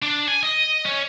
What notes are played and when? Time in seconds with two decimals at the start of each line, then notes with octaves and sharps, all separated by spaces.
0.02 D4
0.28 G#5
0.43 D#5
0.85 C#4